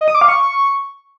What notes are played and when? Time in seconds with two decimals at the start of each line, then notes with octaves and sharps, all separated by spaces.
0.01 D#5
0.08 D#6
0.15 D6
0.21 F5
0.28 C#6